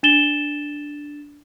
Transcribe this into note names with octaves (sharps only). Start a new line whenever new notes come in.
D4 A6 E7 G7